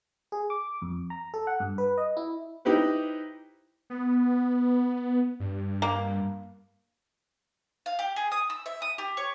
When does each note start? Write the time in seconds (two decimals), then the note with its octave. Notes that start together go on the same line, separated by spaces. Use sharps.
0.32 G#4
0.50 D6
0.82 F2
1.10 A#5
1.34 A4
1.47 F#5
1.60 G2
1.78 B4
1.98 D#5
2.17 E4
2.65 D#4 E4 G4 B4 C5
3.90 B3
5.40 G2
5.82 A#3
7.86 F5
7.99 G4
8.16 G#4
8.32 D#6
8.50 E6
8.66 E5
8.82 D#6
8.98 G4
9.17 C#5